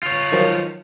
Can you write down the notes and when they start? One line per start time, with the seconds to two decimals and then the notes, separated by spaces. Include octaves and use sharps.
0.03 F4 C#5
0.32 D#3 F3 F#3